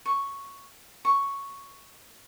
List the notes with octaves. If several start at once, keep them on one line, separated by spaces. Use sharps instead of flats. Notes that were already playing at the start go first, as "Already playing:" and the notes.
C#6
C#6